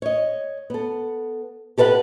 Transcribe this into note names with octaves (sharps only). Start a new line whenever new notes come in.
C#5 D#5
B3 A4
G4 A4 B4 E5 F#5